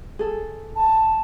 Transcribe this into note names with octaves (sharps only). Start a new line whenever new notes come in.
G#4 A4
A5